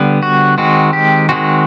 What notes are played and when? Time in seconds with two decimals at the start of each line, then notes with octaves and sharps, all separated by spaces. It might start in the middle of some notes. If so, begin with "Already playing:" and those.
Already playing: D3 G3 B3
0.23 F#4
0.58 D#3 G#3 C4 F#4
0.93 G4
1.29 D#3 G#3 C4 F#4